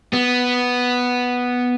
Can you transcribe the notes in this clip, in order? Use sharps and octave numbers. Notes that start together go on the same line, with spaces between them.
B3